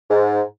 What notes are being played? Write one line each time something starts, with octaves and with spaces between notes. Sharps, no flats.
G#2